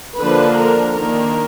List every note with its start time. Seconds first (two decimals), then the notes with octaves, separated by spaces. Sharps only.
0.19 D3 F3 A#3 D4 B4
0.58 A#4
0.95 D#3 A#3 D4 A#4